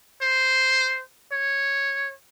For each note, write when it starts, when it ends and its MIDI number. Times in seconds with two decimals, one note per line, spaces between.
0.22 1.03 72
1.32 2.12 73